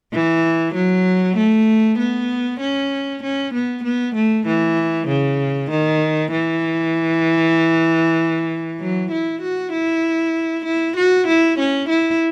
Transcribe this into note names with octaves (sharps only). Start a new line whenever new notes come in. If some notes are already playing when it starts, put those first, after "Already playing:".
E3
F#3
A3
B3
C#4
C#4
B3
B3
A3
E3
C#3
D#3
E3
F#3
E4
F#4
E4
E4
F#4
E4
C#4
E4